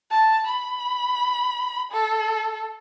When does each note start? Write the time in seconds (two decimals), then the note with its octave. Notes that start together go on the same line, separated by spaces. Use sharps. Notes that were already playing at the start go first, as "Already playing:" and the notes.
0.11 A5
0.47 B5
1.91 A4